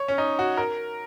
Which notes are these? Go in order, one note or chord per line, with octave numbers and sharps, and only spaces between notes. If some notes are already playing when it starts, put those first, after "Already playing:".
Already playing: C#5
C#4
D#4
F#4
A#4